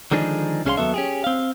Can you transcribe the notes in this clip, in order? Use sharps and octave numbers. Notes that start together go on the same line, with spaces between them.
D3 D#3 F3 G#3 D4 G#4
C2 C#4 G#4 C5 F5 C6
D#2 B2 F#3 B3 A4 E5
C#4 G4 G#4
C4 F5